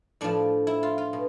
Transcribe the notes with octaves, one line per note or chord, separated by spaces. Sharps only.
A2 F3 D4
E4
F4
F4
B2